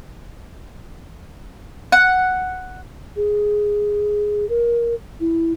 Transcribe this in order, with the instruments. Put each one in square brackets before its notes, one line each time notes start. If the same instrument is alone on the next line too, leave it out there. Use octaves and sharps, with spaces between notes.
[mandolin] F#5
[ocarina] G#4
A#4
E4